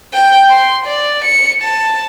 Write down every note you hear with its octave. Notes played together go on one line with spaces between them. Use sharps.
G5
C6
D5
C#7
A5